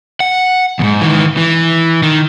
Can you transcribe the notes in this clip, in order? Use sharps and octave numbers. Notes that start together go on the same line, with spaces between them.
F#5
E2 G#2
D#3 E3
E3
D#3